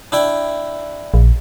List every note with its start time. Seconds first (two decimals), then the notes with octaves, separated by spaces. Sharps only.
0.12 D4 E4 G5
1.14 A#1